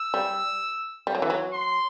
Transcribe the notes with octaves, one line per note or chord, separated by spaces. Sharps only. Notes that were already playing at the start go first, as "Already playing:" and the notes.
Already playing: E6
G3
G3
F#3
E3
F#3
C6